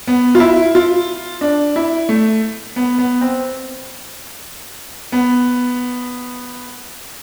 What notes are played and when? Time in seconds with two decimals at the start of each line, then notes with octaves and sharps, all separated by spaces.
0.07 B3
0.35 F4
0.40 E4
0.75 F4
1.41 D4
1.76 E4
2.09 A3
2.76 B3
2.98 B3
3.21 C4
5.12 B3